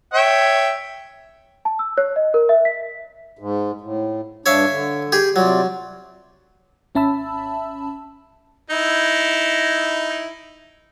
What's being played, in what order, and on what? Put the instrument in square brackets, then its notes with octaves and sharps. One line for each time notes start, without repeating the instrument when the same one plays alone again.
[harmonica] C#5 E5 G5
[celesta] A5
E6
C#5
D#5
A#4
E5
B6
[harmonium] G#2
A2
[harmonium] G2 D4 [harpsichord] C#5 E5 F5
[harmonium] D3
[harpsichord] G4 G#4
[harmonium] C3 F4 D5 [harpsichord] F#3
[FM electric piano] G#1 C#4 E5 A5 B5 E6
[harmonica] D#4 E4